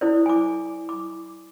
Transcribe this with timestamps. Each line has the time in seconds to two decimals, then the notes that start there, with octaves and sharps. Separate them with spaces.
0.01 E4 A4 C5 D5
0.26 G#5 D6
0.89 D6